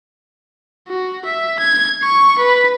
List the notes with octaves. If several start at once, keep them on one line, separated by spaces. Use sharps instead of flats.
F#4
E5
G#6
C#6
B4